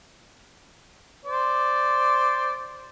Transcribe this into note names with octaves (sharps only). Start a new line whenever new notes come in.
C5 D5